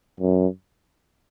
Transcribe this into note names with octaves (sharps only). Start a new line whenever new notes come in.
F#2